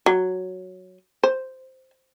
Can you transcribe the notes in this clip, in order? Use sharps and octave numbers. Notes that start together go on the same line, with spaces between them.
F#3
C5